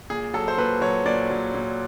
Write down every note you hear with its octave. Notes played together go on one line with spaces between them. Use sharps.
A#2 G#4
F#3 A4
C5
A#2 B4
F#3 C#5
A#2 D5
F#3
A#2